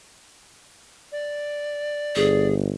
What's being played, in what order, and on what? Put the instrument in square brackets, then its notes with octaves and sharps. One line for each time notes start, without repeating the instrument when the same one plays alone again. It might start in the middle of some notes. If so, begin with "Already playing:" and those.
[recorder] D5
[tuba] G1 [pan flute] G#4